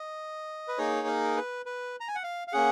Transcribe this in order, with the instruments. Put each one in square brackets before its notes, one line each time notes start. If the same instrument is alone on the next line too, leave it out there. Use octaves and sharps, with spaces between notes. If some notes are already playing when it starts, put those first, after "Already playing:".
Already playing: [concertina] D#5
B4
A#3 D#4 G#4 C#5
A#4
B4
B4
A#5
G#5
F#5
F5
F5
A#3 C#4 G#4 F#5